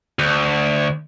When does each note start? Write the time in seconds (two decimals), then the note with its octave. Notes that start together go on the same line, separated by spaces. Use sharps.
0.19 D2